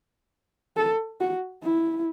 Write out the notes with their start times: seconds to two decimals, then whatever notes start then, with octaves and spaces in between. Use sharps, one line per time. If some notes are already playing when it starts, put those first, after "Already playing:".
0.77 A4
1.21 F#4
1.64 E4